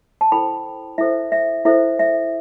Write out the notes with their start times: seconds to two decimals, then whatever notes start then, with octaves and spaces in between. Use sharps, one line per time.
0.21 A5
0.32 E4 A4 C5 G5 B5
0.98 E4 A4 C5 E5
1.32 E5
1.65 E4 A4 C5 E5
1.99 E5